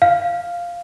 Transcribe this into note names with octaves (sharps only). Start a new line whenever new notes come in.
F5